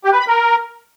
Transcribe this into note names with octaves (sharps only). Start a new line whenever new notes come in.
G4
B4
B5
A#4